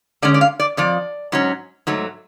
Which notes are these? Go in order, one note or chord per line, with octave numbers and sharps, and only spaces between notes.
D3 G#3 C#4 D5
D5
F5
D5
F2 F3 D5
G#2 F#3 C#4
G#2 F#3 A3